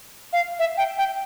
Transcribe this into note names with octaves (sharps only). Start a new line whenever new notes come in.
F5
E5
G5
G5